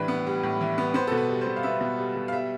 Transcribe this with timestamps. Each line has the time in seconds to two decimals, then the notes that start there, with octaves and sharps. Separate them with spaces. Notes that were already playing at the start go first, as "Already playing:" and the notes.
Already playing: A2 E3 G3 D4 B4
0.08 B3
0.27 G3
0.43 A2
0.61 E3
0.78 B3
0.94 B3 C5
1.07 B2 A4
1.17 B4
1.29 G3
1.41 C5
1.47 B2
1.56 F5
1.63 B3 E5
1.81 B2
1.99 G3
2.16 B2
2.28 F5
2.32 G3 E5